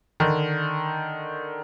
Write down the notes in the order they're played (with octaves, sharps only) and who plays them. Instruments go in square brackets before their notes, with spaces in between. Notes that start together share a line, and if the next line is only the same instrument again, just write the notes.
[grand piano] D3 D#3